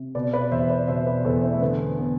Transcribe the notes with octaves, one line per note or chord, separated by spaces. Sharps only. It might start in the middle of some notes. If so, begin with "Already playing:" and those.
Already playing: C3
B2 B4 D5
B4 D5
E2 C5 E5
B4 D5
B2 C5 E5
B4 D5
E2 A4 C5
C4 E4
A3
D3 B3
B3